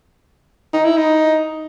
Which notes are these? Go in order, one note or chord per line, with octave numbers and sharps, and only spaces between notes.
D#4
E4
D#4